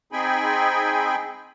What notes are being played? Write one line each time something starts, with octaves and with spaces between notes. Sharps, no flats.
C4 D#4 G#4 G5 G#5 B5